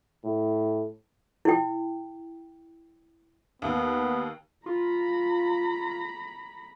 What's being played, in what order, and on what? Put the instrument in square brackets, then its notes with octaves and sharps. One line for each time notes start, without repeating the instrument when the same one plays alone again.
[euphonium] A2
[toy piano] E4 G5
[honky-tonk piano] D#2 [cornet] B3
[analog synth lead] F4 [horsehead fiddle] A#5 B5